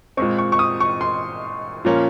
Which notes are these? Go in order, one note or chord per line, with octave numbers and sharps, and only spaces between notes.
A#2 G#3 C4 C#6
C#6
C#6
D#6
C#6
C6
A#2 F3 A#3 C#4